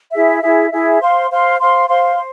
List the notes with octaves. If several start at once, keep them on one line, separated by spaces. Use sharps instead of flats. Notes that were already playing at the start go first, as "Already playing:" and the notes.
E4 G#4 E5
E4 G#4 E5
E4 G#4 E5
C5 F5 C6
C5 F5 C6
C5 F5 C6
C5 F5 C6
C5